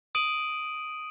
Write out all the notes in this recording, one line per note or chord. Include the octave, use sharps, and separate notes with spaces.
D#6 D7 D#7 F#7